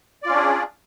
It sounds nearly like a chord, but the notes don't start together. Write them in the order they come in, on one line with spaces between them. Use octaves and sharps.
D5 F4 C#4 D4 G#4